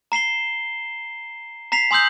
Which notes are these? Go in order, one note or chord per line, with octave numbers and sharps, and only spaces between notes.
A#5 C7 E7 G7
A#5 B6 C7 F7
G#5 C6 D#6 E6 G6 F#7